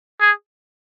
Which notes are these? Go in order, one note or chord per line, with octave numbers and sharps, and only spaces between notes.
G#4